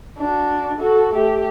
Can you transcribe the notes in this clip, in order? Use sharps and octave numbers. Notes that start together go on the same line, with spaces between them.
D4 F#4
F#4 A4
A3 G4